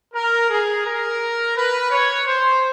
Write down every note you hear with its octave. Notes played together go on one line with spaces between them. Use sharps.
A#4
G#4
A#4
B4
C#5
C5